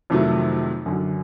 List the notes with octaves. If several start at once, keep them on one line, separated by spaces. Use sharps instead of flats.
F2 C3 D#3 F#3 A3
F#2 D3 F#3